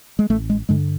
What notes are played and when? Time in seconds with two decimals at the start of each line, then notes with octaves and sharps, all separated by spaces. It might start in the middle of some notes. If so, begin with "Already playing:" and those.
0.19 G#3
0.30 A1 A3
0.50 G#3
0.69 G2 D3 G#3